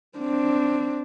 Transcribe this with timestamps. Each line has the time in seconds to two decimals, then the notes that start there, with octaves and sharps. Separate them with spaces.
0.18 C4 D4